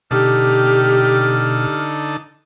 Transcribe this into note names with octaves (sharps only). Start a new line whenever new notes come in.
B2 D3 D#4 G4 A4 F6